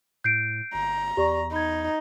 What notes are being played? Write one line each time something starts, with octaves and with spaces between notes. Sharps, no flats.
A2 G6 C7 D7
G1 A#5
E2 G4 D5 C#6
D#4 B5 G#6